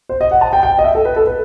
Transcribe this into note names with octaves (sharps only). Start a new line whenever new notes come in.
C5
D#5
F#5
A5
G5
G5
D#5
E5
A4
B4
A4
B4